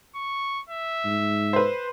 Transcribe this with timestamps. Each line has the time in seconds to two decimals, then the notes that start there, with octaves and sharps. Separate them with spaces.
0.15 C#6
0.69 E5
1.05 G#2
1.53 B4 C5